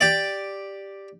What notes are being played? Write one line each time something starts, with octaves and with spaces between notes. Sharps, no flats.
G4 D5